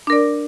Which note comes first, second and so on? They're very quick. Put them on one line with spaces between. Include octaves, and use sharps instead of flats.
D4 A#4 D5